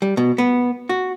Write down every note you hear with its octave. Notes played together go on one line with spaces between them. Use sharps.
G3
B2
B3
F#4